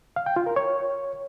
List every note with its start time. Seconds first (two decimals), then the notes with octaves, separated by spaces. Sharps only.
0.16 F5
0.26 G5
0.36 F4
0.46 A#4
0.56 C#5